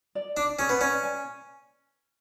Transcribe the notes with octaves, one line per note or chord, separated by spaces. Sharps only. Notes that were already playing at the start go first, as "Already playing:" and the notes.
D5
D4 D5
C#4 G#4
B3
C#4 D5
G#5